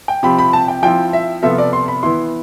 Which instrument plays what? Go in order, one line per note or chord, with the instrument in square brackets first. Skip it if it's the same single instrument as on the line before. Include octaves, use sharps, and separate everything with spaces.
[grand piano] G5
[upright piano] C3 F3 C4 G4 [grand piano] B5
[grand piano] B5
A5
G5
[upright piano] F3 C4 E4 [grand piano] G5
[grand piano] E5
[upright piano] C3 F3 B3 F4 A4 [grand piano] E5
[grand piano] D5
C6
B5
[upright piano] E3 B3 E4 [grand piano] C6